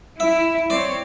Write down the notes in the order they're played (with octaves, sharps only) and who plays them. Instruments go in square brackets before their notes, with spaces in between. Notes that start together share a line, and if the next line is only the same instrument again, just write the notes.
[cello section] E4 [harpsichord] E5
[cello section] C4 C#5 [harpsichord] D5